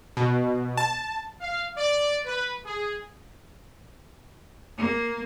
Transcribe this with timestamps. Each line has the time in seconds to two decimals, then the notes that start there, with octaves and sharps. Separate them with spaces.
0.17 B2
0.77 A5
1.41 F5
1.77 D5
2.25 B4
2.65 G#4
4.78 A#3